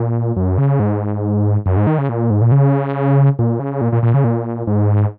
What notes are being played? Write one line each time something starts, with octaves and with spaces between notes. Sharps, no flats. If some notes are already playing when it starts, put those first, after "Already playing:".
Already playing: A#2
F#2
C#3
G#2
F#2
G#2
D#3
C#3
A#2
G#2
A#2
C#3
A#2
C#3
A#2
A#2
A#2
C#3
A#2
G#2